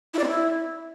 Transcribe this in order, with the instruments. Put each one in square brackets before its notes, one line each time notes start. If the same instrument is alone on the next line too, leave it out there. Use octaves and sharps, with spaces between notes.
[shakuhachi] E4
D5
C4
E4